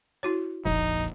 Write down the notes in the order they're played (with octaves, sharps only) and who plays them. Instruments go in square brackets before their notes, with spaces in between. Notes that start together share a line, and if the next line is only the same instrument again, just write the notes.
[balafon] E4 F#4 C#5
[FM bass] E1 [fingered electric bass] A#1 F2 [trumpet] D#4